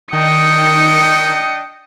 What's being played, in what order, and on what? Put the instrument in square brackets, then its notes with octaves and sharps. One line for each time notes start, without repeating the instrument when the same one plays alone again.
[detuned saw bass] D#3 [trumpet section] D4 D#5 G5 [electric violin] D#6 C#7